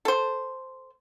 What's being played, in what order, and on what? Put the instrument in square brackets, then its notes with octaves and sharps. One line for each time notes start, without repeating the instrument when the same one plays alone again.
[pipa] A4 C5